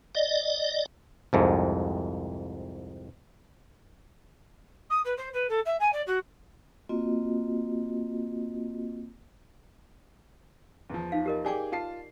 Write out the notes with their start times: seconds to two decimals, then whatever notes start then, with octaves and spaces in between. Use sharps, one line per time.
0.15 D5 D#5
1.33 C2 F2 G#2
4.90 D#6
5.04 B4
5.17 C5
5.33 B4
5.49 A4
5.65 E5
5.80 G#5
5.92 D5
6.06 F#4
6.89 A#3 C4 F4 F#4 D#5
10.90 E2 F3
11.12 D#4 F5
11.26 G4 A#4 D#5
11.45 G4 G#4 D5 G5 G#5 D6
11.72 F4 A5 C7